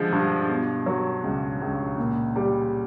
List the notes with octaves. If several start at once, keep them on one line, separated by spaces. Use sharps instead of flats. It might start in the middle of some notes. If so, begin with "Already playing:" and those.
Already playing: D3 F3 G#3
G2
B2
F#3
C#2
C#2
A#2
G3